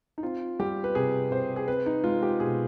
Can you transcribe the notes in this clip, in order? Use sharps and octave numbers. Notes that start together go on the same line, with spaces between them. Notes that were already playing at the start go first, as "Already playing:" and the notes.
D#4
C4 F4
G3 G4
B4
C3 G#4
C3 C5
G#4
C4 B4
D#4
G#3 F4
G4
B2 G#4